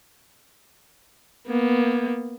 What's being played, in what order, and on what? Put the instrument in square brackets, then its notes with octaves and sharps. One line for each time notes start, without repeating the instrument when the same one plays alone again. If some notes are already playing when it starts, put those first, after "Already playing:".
[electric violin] A#3 B3